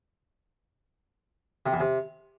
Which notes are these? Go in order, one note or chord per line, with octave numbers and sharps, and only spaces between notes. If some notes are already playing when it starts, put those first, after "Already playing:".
C3
E2
C3